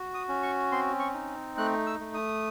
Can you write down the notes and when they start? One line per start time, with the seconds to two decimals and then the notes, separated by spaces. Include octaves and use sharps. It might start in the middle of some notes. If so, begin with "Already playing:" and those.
Already playing: F#4
0.14 D#6
0.29 C#4
0.43 C#6
0.72 C4 C6
0.99 C#6
1.14 D#4
1.57 A3 F#6
1.86 E6
2.00 A3
2.14 D#6